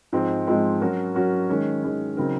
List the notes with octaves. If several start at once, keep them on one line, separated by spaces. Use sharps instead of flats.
G#2 F3 G#3 C4
G#2 F3 G#3 C4
F#3 C#4 F#4 A#4
F#3 C#4 F#4 A#4
D#3 G#3 C#4
D#3 G#3 C#4
C#3 F#3 C4 D#4 A#4